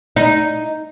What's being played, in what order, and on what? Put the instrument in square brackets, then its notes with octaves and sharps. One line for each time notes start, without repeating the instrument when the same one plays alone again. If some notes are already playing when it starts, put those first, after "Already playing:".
[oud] D#4